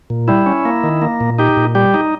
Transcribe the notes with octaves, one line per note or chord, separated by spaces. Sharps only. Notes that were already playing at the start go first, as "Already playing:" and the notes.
A#2
G3 E4
C#4
A#3
D#3
A#3
A#2
D#4 G4
A#2
G3 G4
D#4